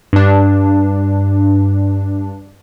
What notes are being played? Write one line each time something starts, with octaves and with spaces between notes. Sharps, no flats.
G2 D4